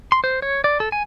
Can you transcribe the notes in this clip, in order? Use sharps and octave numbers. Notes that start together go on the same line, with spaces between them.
C6
C5
C#5
D5
A4
G#5